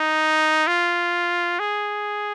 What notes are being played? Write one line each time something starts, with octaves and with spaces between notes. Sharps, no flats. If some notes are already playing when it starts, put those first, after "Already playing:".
Already playing: D#4
F4
G#4